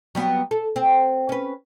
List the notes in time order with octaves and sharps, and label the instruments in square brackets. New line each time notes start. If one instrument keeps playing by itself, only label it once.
[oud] F#3 G3 B3
A4
C4
C#4 B4